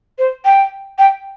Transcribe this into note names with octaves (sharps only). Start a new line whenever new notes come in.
C5
G5
G5